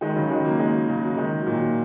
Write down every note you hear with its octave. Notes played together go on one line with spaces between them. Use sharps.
D#3 G#3
C#3 F#3
D#3 G#3
F#3 A#3
D#3 G#3
C#3 F#3
D#3 G#3
F#3
A#2 D#3